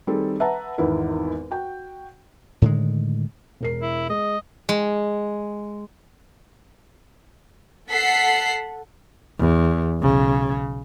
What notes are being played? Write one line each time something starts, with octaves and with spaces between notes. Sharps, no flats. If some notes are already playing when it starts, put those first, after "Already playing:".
D#3 G3 C4 G#4 A4
B4 E5 F#5 A5 A#5
G#1 E2 D#3 B3 E4 A#4
F#4 G5
A2 D3 D#3 G#3
E1 A#4 C7
E4
G#3 D#5
G#3
A4 F#5 B6 C7
E2
B1 C#3